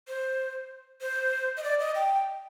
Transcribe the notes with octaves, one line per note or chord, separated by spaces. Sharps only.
C5
C5
D#5
D5
D#5
G5